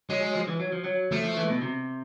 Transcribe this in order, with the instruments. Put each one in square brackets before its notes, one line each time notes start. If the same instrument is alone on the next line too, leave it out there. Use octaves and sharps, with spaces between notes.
[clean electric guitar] F#3 [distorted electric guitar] G#3
[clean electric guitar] F#3
F3
E3
F#3
F3
F#3
[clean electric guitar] F3 [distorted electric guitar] A3
[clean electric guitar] F3
E3
B2
C3